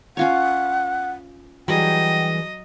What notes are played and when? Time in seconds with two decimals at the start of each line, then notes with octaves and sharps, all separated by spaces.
0.17 C#4 F4 C#5 F#5
1.68 E3 F#3 G3 G#4 D#5 G5